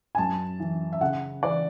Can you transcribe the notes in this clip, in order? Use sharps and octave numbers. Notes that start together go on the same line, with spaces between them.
G#5
F#2 A5
E3
E5
C#3 F#5
E3 D5